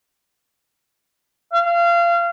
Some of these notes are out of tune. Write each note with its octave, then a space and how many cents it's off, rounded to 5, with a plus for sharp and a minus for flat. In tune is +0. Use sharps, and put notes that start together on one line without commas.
F5 -25